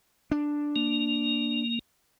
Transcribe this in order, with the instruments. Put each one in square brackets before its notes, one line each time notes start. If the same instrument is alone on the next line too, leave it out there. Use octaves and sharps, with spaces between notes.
[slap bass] D4
[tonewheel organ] A#3